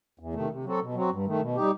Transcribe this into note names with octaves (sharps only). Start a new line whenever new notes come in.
E2
C3 D#3 A3
C3
F#3 C4 F#4 A4
B2
F#3 C4 F#4
G2
D#3 A3
B2
G3 D#4 G4